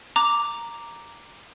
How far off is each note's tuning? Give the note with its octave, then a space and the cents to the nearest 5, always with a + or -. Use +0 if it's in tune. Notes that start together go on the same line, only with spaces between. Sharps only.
A#5 +0 D6 +0